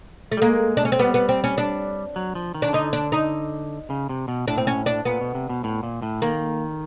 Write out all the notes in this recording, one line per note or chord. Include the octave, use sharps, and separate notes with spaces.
A3
G3
G#3 A#3
D4
C#4
C4
G3 B3
B3
C4
C#4
D4
F#3
F3
D#3
D4
D3 D#4
D4
D#4
C#3
C3
B2
A2 D4
C4
C#4
D4
A#2 B3
B2
C3
B2
A2
A#2
A2
D#3 A#3